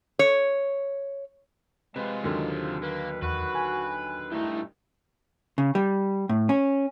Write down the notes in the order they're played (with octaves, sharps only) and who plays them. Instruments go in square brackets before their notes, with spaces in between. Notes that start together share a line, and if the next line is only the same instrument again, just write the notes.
[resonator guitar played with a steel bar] C#5
[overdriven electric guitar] C3 F4 [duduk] G#3 [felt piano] B4
[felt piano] D#2 D3 F#3
[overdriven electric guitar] A#3 [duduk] B4
[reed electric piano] E2 [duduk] F#4 [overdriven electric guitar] B4
[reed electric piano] G#5
[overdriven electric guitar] G2 D#4 [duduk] A3 [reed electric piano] E4
[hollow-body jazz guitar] C#3
G3
A2
C#4